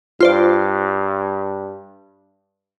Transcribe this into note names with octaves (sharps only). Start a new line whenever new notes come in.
G2 F4 C5 D5